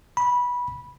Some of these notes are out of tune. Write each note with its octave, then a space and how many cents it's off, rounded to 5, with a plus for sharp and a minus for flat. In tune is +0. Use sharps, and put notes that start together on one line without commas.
B5 -15